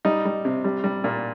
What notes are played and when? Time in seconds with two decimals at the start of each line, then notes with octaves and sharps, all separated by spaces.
0.05 G3 D#4
0.25 G3
0.45 C3
0.64 G3
0.84 G3
1.04 A#2